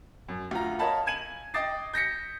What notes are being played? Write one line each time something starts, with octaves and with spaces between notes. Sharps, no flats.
F#2
D2 F4 A#5
A#4 C#5 D#5 F5 A5 B5
G#5 G#6 D#7 F#7
D#5 G5 D6 D#6 A6 C7
G6 A#6 B6 C#7